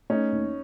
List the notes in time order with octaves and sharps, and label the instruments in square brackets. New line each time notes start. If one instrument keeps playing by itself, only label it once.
[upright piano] A3 [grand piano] C#4 D#4
[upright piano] D#2